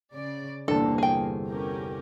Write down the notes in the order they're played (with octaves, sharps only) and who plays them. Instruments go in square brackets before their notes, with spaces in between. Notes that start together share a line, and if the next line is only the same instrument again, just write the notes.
[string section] C#3 D5
[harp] G1 E2 C3 [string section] A#3 [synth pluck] D4 A5 [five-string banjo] A4
[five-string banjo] G#4 G5
[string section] C#4 G4 A#4